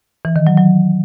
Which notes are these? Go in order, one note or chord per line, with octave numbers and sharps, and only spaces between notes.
E3
D#3
F#3
F#3